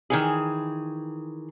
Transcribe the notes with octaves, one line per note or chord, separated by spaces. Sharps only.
D#3 E3 G#4